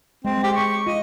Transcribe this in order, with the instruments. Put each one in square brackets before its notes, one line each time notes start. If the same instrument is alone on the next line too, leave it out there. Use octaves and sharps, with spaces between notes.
[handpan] G#3 [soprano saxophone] C4
[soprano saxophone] G4
C#6
[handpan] F4 [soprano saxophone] D#5